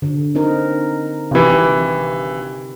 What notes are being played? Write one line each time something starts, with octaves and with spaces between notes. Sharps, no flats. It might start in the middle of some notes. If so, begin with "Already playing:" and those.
D3
C4 D#4 A#4
G#1 C3 E3 G4